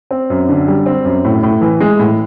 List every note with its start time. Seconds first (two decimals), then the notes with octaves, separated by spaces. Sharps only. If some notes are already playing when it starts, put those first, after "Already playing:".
0.11 C4
0.30 F#2
0.49 D3
0.68 G3
0.86 C4
1.05 F#2
1.25 A2
1.43 A2
1.61 E3
1.81 G#3
1.99 A2